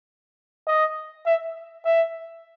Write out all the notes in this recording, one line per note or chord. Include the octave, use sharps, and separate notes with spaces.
D#5
E5
E5